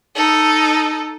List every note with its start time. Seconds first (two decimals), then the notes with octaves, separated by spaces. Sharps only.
0.15 D#4 A4